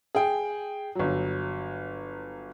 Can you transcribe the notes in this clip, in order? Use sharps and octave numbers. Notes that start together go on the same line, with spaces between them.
G#4 G5
G1 F#3